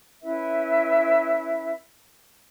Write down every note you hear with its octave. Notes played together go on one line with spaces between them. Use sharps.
C#4 E4 B4 E5